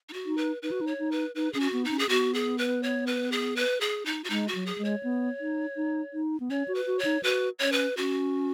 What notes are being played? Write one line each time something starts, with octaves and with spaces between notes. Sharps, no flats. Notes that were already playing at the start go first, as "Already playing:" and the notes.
D#4
F#4
D#4
B4
D#4 B4
F#4
D#4
C#5
D#4
B4
D#4 B4
C#4 G#4
F#4
B3
D#4
C#4
G#4
B3 F#4
G#4
B4
C#5
B4
G#4
B4
G#4
D#4
F#4
G#3 D#4
F#4
F#3
G#4
G#3
C#5
B3
D#4
D#4
D#4
B3
C#4 C#5
F#4
B4
F#4
C#5
D#4
F#4 B4
C#4 C#5
B4
C#4 F#4